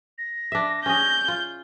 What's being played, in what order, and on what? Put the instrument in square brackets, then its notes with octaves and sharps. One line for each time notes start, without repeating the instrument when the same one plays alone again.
[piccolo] A#6
[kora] D4 E5
[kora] C#4 G#4 [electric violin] G6
[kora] F4